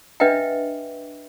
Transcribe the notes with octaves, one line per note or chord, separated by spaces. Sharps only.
D4 B4 D#5 E5 F#5 G5